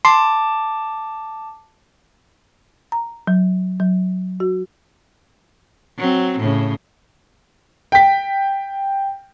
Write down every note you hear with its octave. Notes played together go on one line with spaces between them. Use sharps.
A5 C6 D6
A#5
F#3
F#3
F#4
F#3 C4
A2 C#3
G5 B6